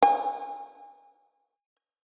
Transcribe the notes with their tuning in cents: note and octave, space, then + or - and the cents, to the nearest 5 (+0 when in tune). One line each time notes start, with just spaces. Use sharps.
G#5 -25